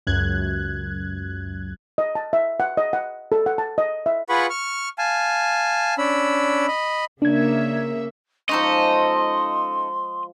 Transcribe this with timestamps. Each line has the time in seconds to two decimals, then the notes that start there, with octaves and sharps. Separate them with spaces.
0.07 C#2 F#2 F#6 G#6
1.98 D#5
2.15 A5
2.33 E5
2.60 F#5
2.77 D#5
2.93 F#5
3.32 A4
3.46 F#5
3.58 A5
3.78 D#5
4.06 E5
4.29 F4 G#4 B4 F#5 B5 C#6
4.50 C#6 F6
4.98 F5 G#5 A5
5.98 C#4 D4 B5 E6
6.68 D#5 B5
7.22 C#3 A#3 D4 E5 G#6
8.49 F3 G#3 C#4 D#4 A4 D#5 C6